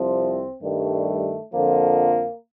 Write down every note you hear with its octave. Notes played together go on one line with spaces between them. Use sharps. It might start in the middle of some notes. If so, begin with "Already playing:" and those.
Already playing: C2 C3 F3 C4
G2 D#3 G3 A3
F2 D3 F3 A#3